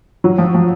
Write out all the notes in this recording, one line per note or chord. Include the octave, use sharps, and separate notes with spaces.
F#3
F3
F3